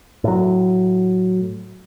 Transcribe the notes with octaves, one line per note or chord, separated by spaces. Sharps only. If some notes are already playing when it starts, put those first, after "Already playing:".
A2 F#3